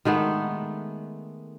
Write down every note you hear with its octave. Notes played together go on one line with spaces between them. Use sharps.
D#3 G#3 A3 B3